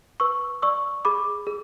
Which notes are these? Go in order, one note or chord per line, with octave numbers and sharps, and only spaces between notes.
B4 C#6 E6
D5 C#6 E6
G#4 B5 D6
G#4